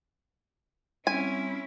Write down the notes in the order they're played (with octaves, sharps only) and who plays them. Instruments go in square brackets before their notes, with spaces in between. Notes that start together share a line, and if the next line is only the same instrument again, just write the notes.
[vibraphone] G3 C4 [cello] C#4 E4 [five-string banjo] G#5